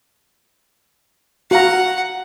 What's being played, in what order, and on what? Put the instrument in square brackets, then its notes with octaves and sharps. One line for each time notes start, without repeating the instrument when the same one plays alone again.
[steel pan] F#4 F5 A#5 [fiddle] F#5